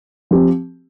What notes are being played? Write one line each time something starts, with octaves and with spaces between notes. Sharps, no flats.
F3 C4 G4